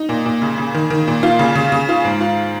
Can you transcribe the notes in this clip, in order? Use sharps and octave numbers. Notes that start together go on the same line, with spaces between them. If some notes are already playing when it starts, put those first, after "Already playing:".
Already playing: D#4
A#2
A#2
C#3
C#3
D#3
D#3
A#2
F4
C#3
C#3
C#3
F4
G#2
F4